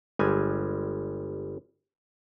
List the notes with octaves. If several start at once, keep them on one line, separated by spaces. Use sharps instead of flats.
G1 G3 G#3 G#5